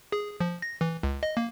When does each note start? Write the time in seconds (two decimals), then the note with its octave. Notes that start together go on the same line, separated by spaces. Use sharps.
0.12 G#4
0.40 F3
0.62 A#6
0.81 E3
1.03 C#2
1.23 D#5
1.37 A#3